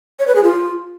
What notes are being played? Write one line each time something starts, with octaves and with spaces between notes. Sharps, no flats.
C#5
B4
G#4
F4